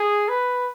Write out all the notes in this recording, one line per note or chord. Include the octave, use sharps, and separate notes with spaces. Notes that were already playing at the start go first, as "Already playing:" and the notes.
Already playing: G#4
B4